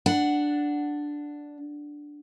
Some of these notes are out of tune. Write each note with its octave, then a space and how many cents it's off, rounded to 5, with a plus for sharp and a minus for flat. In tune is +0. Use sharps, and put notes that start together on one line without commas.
D4 +0 F#5 +0